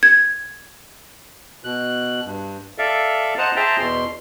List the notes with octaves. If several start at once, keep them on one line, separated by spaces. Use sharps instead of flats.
G#6
B2 F#6
G2
A4 D5 E5 F5
C5 D#5 F#5 A5 A#5
G#4 C5 E5 G5 A5 A#5
E2 B2 C6